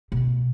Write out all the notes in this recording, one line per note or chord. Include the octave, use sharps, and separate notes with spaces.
B2